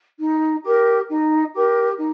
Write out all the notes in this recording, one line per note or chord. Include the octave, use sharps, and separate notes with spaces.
D#4
G4 A#4
D#4
G4 A#4
D#4